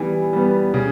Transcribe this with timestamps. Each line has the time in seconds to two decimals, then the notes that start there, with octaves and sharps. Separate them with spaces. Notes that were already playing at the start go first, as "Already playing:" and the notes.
Already playing: E3 G3 B3
0.33 G3 B3
0.74 C#3